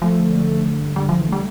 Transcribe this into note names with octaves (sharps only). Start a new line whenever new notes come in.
F3 A3
D3
A3
D3
D3
G2
D3 G3
D3 F3
E3
G3 A3